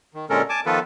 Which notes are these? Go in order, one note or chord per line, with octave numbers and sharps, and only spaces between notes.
D#3
A#2 D3 G#3 C#4 A4 A#4
G#5 A5 D6
D#3 F3 B3 F4 A4 B4